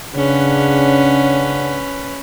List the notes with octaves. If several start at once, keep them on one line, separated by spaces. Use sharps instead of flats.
C#3 C#4 D4 B4 F#5